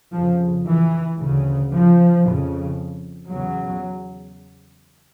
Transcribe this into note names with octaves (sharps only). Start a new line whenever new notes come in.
F2 C#3 F3
E3
D2 C#3
F3
F2 C#3
E2 C#3 F#3